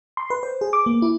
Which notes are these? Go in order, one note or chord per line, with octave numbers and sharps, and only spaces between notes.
C6
B4
C5
G#4
D6
A#3
E4